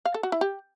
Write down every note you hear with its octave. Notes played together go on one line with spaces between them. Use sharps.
F5
A4
F#4
E4
G4